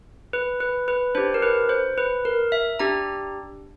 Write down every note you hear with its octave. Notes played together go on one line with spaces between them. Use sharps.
B4
B4
B4
D4 G4 C5
A#4
B4
C5
B4
A#4
E5
D4 G4 A#5